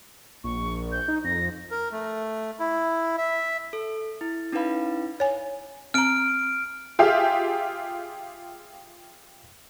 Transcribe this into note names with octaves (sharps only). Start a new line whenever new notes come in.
A#1 C#6
G6
D#4
F2 A#6
A#4
A3
E4
E5
A4
E4
C#4 D#4 E4 B4 F5 B5
C#5 G#5
C4 A#5 F6 D7
F4 G4 G#4 E5 F5